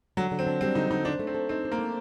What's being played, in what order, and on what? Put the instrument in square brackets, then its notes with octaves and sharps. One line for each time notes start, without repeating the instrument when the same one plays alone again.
[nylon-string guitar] D3 [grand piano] F#3
[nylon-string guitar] D3
[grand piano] C4
[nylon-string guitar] D4
[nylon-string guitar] G3 [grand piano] C4
[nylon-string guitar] D3 [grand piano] D#4
[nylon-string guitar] D3 [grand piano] D#4
[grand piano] D4 [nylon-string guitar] C5
[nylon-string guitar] A3
[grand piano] C4
[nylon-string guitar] A4
[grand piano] C4 [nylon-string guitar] D#4
[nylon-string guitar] C5
[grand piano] A#3
[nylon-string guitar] A3